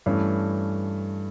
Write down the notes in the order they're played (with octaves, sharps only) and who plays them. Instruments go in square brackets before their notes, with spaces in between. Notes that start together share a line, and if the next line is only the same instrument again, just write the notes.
[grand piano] G2 E3 A3 C#4